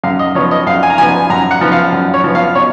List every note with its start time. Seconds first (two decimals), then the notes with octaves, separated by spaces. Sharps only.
0.03 F#2 F5
0.19 D#5
0.35 F3 B3 C#5
0.51 D#5
0.67 F#2 F5
0.83 G#5
0.90 A#5
0.98 F3 B3 G#5
1.14 G#5
1.30 F#2 A#5
1.51 F#5
1.61 F3 B3
1.72 F5
1.92 F#2
2.14 C#5
2.24 F3 B3
2.35 F5
2.55 B2 C#5